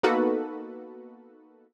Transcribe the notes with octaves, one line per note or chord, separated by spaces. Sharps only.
A#3 B3 D#4 F#4 A4 B4